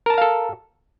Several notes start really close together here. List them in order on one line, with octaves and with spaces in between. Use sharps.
A#4 A5 A#5 F5 A4